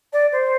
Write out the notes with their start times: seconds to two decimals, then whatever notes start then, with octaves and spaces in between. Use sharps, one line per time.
0.13 D5
0.32 C5